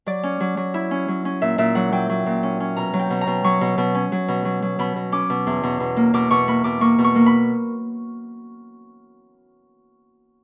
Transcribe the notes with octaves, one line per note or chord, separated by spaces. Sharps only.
F#3 D5
C#4
F#3
F#3
E4
C#4
F#3
C#4
A#2 E5
A#2 E5
F#3 F#5
F#3 G5
F#3
A#2
C#4
C#4
B2 A#5
F#3
G5
B2
A#5
B2
F#3 C#6
B2
B2
C#4
F#3
B2
F#3
F#3
B2 B5
B2
C#4 D6
B2
E2
B2
B2
A#3
B2 D6
B2 C#6
A#3 B5
B2 D6
A#3 C#6
B2
C#6
A#3
B5